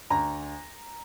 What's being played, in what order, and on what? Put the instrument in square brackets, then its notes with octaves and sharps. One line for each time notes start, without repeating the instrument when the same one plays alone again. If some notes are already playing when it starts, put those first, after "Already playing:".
[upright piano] D2 A#5